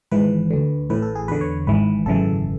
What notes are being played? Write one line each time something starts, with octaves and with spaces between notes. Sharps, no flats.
G#1 G#2 E3 B4
D2 D3
A1 A2 E3 B4
A4
G#4
E2 D3 B4
C#5
G#1 G#2 E3 B4
G#1 F#2 C#3 E3 A4